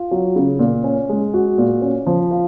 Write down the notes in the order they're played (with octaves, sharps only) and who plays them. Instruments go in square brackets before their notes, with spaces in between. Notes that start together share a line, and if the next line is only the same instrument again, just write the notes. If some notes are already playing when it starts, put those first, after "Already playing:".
Already playing: [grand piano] F4
F#3
C#3
A#2
C#4
G#3
F#4
A#2
C#4
F3
F4